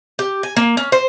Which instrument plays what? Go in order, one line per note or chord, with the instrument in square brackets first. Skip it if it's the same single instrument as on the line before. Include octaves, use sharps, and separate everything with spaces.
[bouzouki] G4
G#5
A#3
C#4
C5